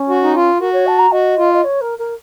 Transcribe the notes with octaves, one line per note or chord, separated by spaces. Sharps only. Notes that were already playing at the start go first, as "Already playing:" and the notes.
Already playing: C#4
F#4
D#4
F4
F#4 A#4
C#5
A5
A#5
F#4 D#5
F4
D#5
C#5
A#4
A#4